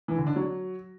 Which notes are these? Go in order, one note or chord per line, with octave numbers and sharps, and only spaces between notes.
E3
D3
D4
F#3